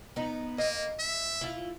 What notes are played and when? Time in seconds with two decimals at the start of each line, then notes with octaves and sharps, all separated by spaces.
0.16 B3 D#4
0.58 A#3 D#5
0.99 E5
1.41 E4 F4